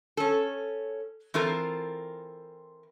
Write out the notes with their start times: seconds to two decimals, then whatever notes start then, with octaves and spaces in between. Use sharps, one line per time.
0.17 C#4 A4
1.34 E3 C4 F4 A4 A#4